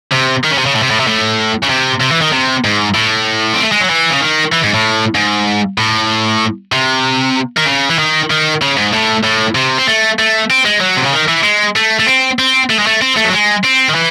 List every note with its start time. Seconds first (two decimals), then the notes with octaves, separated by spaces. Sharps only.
0.12 C3
0.44 D#3
0.51 C#3
0.58 C3
0.66 C#3
0.75 A2
0.82 C3
0.90 A2
1.00 C3
1.07 A2
1.64 C#3
1.70 C3
2.01 C3
2.11 E3
2.22 D#3
2.33 C3
2.64 G#2
2.95 A2
3.54 C4
3.63 A3
3.72 G#3
3.80 F#3
3.90 E3
4.10 C#3
4.21 D#3
4.52 E3
4.63 G#2
4.74 A2
5.15 G#2
5.78 A2
6.72 C3
7.57 D#3
7.66 C#3
7.89 E3
7.99 D#3
8.30 D#3
8.61 C#3
8.77 G#2
8.93 A2
9.23 A2
9.55 C3
9.78 C4
9.87 A3
10.19 A3
10.50 C4
10.65 G#3
10.80 F#3
10.97 C3
11.05 C#3
11.13 D#3
11.28 E3
11.43 G#3
11.76 A3
11.99 A3
12.07 C4
12.39 C4
12.70 A3
12.79 G#3
12.87 A3
13.02 C4
13.17 A3
13.25 F#3
13.32 G#3
13.64 C4
13.90 D#3
13.95 E3